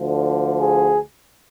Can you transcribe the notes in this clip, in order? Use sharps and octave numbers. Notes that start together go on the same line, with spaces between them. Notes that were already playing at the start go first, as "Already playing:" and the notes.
Already playing: D2 D3 F3
G#4